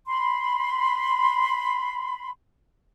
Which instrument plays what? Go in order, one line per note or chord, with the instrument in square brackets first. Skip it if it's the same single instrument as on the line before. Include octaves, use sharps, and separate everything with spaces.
[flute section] B5 C6